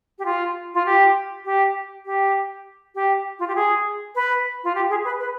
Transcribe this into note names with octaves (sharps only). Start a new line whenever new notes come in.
G4
F4
F4
G4
G4
G4
G4
F4
G4
G#4
B4
F4
G4
G#4
B4
B4